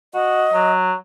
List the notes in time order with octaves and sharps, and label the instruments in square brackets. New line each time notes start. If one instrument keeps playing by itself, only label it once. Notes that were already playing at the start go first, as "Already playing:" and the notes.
[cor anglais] F#4 [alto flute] D#5
[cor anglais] F#3